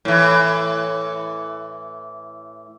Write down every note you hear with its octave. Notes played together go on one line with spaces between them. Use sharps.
A2 E3